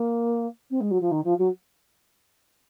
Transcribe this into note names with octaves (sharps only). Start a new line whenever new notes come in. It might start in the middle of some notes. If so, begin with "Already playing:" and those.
Already playing: A#3
C4
G#3
F#3
F3
D#3
F3
F#3